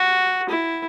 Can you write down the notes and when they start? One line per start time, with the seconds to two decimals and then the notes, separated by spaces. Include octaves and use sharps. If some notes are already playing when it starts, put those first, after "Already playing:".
Already playing: F#4
0.49 E4